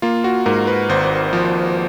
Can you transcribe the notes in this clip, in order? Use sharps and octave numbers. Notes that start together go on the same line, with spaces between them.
A#3 F4
F#4
G#2 A#4
B4
G#1 C5
F3